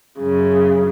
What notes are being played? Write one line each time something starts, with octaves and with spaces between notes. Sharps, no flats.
F#2 C#3